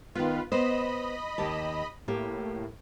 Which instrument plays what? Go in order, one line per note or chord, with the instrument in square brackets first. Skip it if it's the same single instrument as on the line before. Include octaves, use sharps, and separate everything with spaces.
[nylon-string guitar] D#3 B3 [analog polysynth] F4 B4
[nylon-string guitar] B3 B4 C5 [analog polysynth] D#5 B5
[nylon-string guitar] D#2 G4 A5
[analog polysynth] A2 [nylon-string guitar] A#3 G4